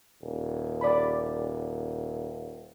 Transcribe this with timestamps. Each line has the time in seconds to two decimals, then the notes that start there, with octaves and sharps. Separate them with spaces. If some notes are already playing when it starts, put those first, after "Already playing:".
0.22 D#1
0.81 D5 B5